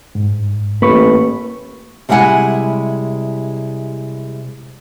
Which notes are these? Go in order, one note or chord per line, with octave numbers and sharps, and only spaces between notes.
G#2
A1 A#3 B4 C#6
C3 G3 G#3 E4 F#5 G#5